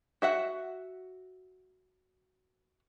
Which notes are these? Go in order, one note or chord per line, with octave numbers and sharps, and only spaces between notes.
F#4 E5 F#5